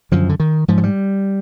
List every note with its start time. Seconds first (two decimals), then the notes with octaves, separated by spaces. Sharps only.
0.12 F#2 D3 F3
0.29 D3
0.40 D#3
0.68 G#2 F3
0.78 F#3
0.83 G3